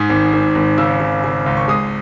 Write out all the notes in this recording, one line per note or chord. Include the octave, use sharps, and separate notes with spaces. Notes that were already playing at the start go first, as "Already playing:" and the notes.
Already playing: G#2 D#6
G#1
G#2
G#1
C#3 E6
C#3
C#3
C#2
C#6
G#3 D#6